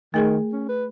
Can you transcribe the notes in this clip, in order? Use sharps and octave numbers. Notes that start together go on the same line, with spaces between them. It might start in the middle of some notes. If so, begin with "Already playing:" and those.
D#3 A3 G#4 A#4
C#4
B4